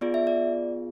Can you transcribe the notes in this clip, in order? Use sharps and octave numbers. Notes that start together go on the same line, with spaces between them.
B3 F4 G#4 D5
E5
D5